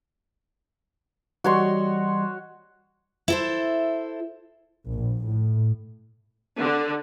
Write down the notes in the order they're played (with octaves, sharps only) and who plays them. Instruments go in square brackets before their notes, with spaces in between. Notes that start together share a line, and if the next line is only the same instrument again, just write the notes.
[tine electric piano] E3 G3 D#5 [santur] F#4 C#5 C6
[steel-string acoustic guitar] E4 A4 C5
[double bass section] A#1
A2
[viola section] D3